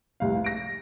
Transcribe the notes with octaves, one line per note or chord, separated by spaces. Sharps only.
F1 C2 F5
A#6 D7